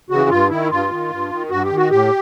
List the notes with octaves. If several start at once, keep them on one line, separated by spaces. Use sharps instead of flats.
C#3 E3 F#4
G2 F4
D#3 E4
G2 F4
D#3
G2
D#3
G2 F#4
G4
D#3
F#4
A2 G4